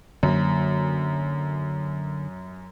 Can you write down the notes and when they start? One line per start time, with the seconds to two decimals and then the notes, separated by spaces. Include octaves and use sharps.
0.23 F#2 D3 A#3